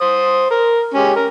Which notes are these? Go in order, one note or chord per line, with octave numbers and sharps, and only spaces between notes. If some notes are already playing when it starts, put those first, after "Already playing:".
C5 D#6
A#4
G#3 C#4 G4
A#4